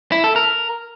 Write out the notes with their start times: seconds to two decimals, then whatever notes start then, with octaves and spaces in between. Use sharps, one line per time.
0.12 E4
0.24 A4
0.36 A#4